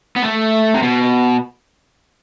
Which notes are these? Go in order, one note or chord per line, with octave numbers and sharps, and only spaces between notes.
B3
A3
C3
B2